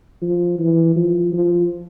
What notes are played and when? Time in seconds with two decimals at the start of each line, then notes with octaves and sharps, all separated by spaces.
0.22 F3
0.59 E3
0.96 F3
1.33 F3